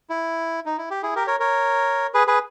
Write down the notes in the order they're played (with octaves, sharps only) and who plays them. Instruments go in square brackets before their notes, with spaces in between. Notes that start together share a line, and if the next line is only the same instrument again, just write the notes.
[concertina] E4
D#4
E4
G4
E4 G#4
G4 A#4
A#4 C#5
A#4 C#5
G#4 B4
G#4 B4